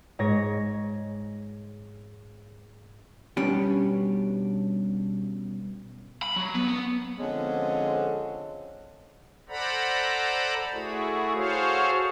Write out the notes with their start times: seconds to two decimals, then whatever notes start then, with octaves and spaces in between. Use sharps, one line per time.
0.19 G#2 C#5 G#6 A#6
3.37 B2 G3 C#4 D4 G4
6.23 B5
6.36 F#3
6.55 B3
6.68 B3
7.20 D3 F3 G#3 C4 C#4
9.49 A4 C5 D5 F#5 A#5 B5
10.73 A3 E4 F#4 G#4
11.35 F#4 G#4 A4 C5 C#5 F5